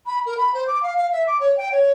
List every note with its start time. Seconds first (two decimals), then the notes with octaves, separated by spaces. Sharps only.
0.06 B5
0.26 A#4
0.37 B5
0.54 C5
0.67 D6
0.82 F5
0.97 F5
1.12 E5
1.27 D6
1.40 C#5
1.57 G5
1.71 C#5